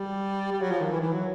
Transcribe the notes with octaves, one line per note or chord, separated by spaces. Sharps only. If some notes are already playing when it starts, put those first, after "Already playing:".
Already playing: G3
G3
F#3
F3
D#3
E3
E3
F#3